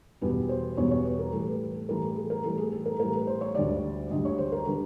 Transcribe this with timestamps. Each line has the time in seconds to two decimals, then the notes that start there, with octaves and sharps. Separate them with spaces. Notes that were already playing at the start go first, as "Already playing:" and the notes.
0.21 E2 B2 G3 B4
0.49 C5
0.77 E2 B2 G3 C#5
0.91 C#5
1.05 B4
1.19 A#4
1.33 A2 E3 G3 A4
1.47 B4
1.74 A4
1.89 A2 E3 G3 A#4
2.02 A4
2.16 G#4
2.30 A#4
2.44 A2 E3 G3 A4
2.58 G#4
2.72 A4
2.86 A#4
2.99 A2 E3 G3 A#4
3.13 B4
3.27 C5
3.41 C#5
3.55 D2 D3 G3 D5
4.10 D2 D3 G3 D#5
4.25 C#5
4.38 C5
4.52 A#4
4.66 D3 G3 B4